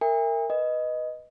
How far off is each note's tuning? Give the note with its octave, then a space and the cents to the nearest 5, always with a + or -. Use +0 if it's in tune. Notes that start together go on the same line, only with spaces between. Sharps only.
A#4 -20 E5 +0 G#5 -45
B4 +0 D#5 +0